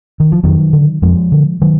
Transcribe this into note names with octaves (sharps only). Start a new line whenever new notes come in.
D#3
F3
F2 D#3 F#3
D3
F2 F3 G#3
D3
D#3 F#3